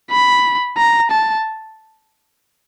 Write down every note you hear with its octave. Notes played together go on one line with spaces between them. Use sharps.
B5
A#5
A5